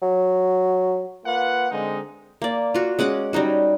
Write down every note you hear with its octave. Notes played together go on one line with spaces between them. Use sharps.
F#3
A#3 F4 B4 F#5
D3 G#3 C4 D#4
A#3 D5
F4 F#4
G#3 C#4 F#5 D6
G3 C#4 D#4 F#4